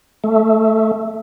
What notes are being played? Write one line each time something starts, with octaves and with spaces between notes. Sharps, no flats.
A3